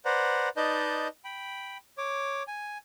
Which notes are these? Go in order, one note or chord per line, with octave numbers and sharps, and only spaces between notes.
B4 C5 D5 F#5 A#5
D#4 B4 D5 D#5 A5 G6
G5 B5
C#5 D6
G#5